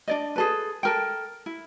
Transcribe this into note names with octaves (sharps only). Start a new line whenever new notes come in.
D4 D5 D#5
G#4 A4 B4
A4 A#4 G5
E4